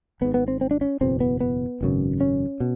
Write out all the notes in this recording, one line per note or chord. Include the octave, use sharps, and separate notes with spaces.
G#1 G#2 B3
B3
C4
C4
D4
C#4
F#1 E2 B2 C4
B3
B3
G#1 F#2 C#3
C#4
B2